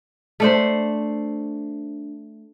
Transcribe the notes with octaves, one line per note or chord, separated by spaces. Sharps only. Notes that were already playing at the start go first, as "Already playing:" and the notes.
A3 D4 C5